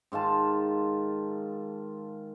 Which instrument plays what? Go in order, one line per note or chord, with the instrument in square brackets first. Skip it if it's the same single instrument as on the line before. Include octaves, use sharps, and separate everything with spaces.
[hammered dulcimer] G#2 D#3 F4 A5